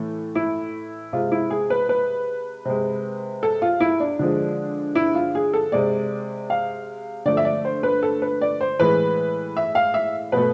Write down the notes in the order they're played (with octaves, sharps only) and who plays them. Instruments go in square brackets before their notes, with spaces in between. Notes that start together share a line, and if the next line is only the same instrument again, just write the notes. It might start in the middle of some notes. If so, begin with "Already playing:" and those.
Already playing: [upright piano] A2 E3 A3
E4
C3 G#3 F4
E4
G#4
B4
B4
C3 G#3
A4
F4
E4
D4
D3 F3 G#3
E4
F4
G#4
A4
C3 G#3 D5
F5
D3 F3 A3 D5
E5
D5
C5
B4
A4
B4
D5
C5
A2 E3 G#3 B4
E5
F5
E5
B2 A3 B4